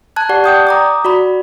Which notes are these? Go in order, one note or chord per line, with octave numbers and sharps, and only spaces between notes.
A5 F#6 G#6
G4 D5 F#5
D5 G5 D#6 G6
A#5 D6 D#6
F#4 D5 B5